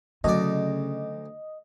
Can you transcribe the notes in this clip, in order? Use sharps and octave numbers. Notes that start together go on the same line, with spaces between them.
D2 C#3 F#3 D5 D#5